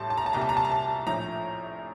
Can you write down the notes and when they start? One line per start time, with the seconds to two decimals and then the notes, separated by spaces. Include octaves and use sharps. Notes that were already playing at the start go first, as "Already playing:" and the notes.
Already playing: A1 A2 G3 A5 C6
0.10 A5
0.17 A#5
0.26 A5
0.33 C2 A#2 G3 A#5
0.41 A5
0.49 A#5
0.57 A5
0.65 A#5
0.72 A5
1.07 A#1 A2 F3 A#5